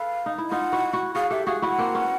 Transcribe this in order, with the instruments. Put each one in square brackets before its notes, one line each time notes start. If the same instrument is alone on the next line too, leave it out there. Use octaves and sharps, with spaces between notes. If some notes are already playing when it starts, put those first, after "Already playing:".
Already playing: [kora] A4 B4 [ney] F5
[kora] D#4
E4
[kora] D#4 F4 [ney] F#5
[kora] E4 F#4
E4 F#4
[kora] F#4 G#4 [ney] F5
[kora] G4 A4 [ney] E5
[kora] F#4 G#4 [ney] F5
[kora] E4 F#4 [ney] F#5
[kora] A#3 C4
B3 C#4